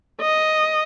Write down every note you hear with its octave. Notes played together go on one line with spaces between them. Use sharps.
D#5